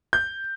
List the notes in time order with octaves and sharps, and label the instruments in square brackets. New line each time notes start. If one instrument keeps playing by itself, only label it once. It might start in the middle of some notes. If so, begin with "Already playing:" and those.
[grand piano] G6